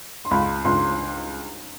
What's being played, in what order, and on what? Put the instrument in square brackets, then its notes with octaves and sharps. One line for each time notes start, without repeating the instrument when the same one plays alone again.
[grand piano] C6
[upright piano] C#2 [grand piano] B5
[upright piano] C#2 [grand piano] C6